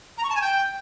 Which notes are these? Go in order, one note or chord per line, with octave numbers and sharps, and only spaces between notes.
A#5
C#6
A5
G#5
G5